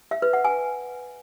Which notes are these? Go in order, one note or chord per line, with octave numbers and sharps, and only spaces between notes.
E5
B4
F#5
G#5